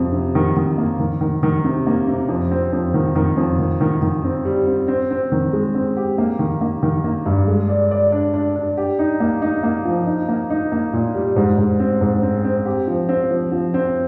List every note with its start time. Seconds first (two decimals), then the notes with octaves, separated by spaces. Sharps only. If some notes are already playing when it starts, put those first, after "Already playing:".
Already playing: F2 C3
0.13 C3
0.35 D#3
0.56 D#3
0.78 A#3
0.99 D#3
1.21 D#3
1.43 D#3
1.65 C3
1.87 A#3
2.08 C3
2.29 F2
2.51 C4
2.73 F2
2.94 D#3
3.15 D#3
3.37 F2
3.59 D#3
3.81 D#3
4.02 D#3
4.24 C4
4.45 G3
4.67 C4
4.88 C4
5.10 C4
5.32 D#3
5.53 G#3
5.74 C4
5.97 G4
6.18 A#3
6.39 D#3
6.61 A#3
6.83 D#3
7.04 A#3
7.26 G2
7.48 G#3
7.69 D5
7.91 D5
8.12 D4
8.34 D4
8.56 D4
8.77 G4
8.99 D#4
9.20 A#3
9.42 D#4
9.63 A#3
9.85 F3
10.07 D#4
10.29 A#3
10.50 D#4
10.72 A#3
10.93 A#2
11.14 G3
11.36 G#2
11.58 G#2
11.80 C4
12.01 G#2
12.23 C4
12.44 C4
12.66 G4
12.87 F3
13.09 C4
13.31 F3
13.52 F3
13.74 C4